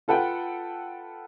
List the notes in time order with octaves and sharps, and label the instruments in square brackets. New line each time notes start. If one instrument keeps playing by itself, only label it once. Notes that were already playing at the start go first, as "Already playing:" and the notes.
[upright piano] F4 A4 B4 F#5 G5